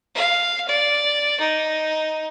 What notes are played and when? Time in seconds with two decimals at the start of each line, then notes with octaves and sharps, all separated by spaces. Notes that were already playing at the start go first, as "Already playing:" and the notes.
0.15 F5
0.68 D5
1.40 D#4